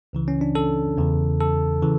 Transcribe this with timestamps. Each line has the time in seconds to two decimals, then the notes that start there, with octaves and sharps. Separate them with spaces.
0.13 C#2 C#3 E3
0.28 C#4
0.41 D4
0.55 A4
0.97 E2 C#3 E3
1.40 A4
1.82 C#3 E3